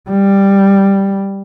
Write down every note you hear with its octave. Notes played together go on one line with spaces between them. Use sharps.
G3